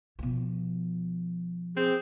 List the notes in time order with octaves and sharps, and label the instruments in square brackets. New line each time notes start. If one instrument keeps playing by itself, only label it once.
[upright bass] B2 F3
[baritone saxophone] C4 [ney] G#4